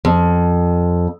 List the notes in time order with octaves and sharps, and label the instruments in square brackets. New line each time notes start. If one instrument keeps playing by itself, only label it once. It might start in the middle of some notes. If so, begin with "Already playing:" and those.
[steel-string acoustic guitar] F2